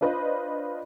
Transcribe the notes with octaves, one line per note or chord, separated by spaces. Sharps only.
D4 F4 B4 C5 D#5